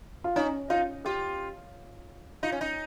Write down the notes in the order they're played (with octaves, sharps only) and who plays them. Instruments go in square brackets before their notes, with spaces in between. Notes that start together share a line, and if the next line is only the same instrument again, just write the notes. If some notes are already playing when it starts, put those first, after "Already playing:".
[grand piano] F4
[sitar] C#4 [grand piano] D#4
[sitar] D#4 [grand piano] F4
[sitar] F4 [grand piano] G4
[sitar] D#4 [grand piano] F4
[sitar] C#4
D#4